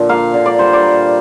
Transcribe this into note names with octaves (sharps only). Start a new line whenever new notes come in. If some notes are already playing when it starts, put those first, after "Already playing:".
Already playing: A#2 D3 F3
A#3 F5
D3
D5
G3 C5
D5
A#3